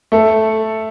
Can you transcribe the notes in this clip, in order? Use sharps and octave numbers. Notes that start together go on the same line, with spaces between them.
A3 A4